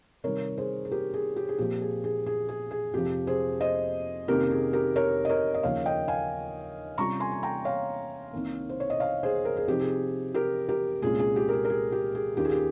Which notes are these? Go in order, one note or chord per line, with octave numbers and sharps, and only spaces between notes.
C3 D#3 G3 A#4 C#5
G#4 C5
G#4
G4 A#4
G#4
G4
G#4
A#2 F3 C4 G4
G#4
G#4
G#4
G#4
G#4
F2 C3 F3 G4
G#4 C5
C5 D#5
F2 C3 D#3 A#3 C#4 G4 A#4
G#4
G4 A#4
A#4 C#5
D#5
A#4 C#5
D#5
D#2 C#3 F3 A#3 C#5 F5
D#5 G5
F5 G#5
C3 G3 C#4 F4 A#5 C#6
G#5 C6
G#5
G5 A#5
C#5 F5
C2 C3 D#3 A#3
C5
C#5
D#5
C#5 F5
G#4 C5
A#4
G#4
C3 F3 C4 D#4 G4
G#4
G4 A#4
G4 A#4
C2 A#2 G#3 C#4 F4 G#4
G#4
G4
A#4
G#4
A#4
G#4
G4
G#4
D#2 D#3 A#3 C#4 F4 G4
G#4
G4